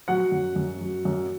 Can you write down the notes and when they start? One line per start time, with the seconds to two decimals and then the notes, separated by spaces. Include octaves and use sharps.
0.08 F#3 F#5
0.32 F#2
0.56 F#2
0.81 F#3
1.05 F#2